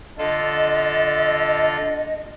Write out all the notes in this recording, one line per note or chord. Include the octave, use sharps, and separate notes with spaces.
D3 F4 A4 D#5